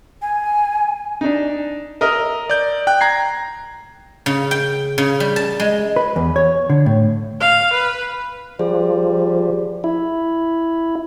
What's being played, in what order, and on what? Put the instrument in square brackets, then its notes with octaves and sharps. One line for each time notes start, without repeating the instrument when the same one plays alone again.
[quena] G#5
[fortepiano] D4 D#4
A#4 D#5 E5
[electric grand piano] D5 G6
G5 F#6
A#5 G#6 C7
[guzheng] C#3
G5
C#3
G3
A5
G#3
[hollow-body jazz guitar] B4
E2
C#5
D3
A2
[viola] F5
B4
[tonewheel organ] F3 [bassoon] G3 [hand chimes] G#4
[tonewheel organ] E4